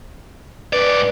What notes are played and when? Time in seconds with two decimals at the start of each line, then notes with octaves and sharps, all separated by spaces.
0.73 G#2 B4 D5